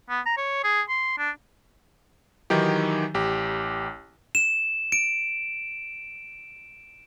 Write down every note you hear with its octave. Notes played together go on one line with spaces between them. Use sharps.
B3
A#5
C#5
G#4
C6
D4
D#3 E3 F#3 D#4 G4
A1 G4
E7
D7